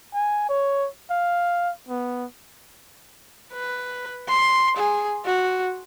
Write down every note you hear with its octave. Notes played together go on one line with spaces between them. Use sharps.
G#5
C#5
F5
B3
B4
C6
G#4
F#4